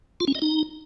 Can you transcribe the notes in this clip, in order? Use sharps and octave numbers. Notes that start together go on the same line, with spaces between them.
F4
C#4
D#5
D#4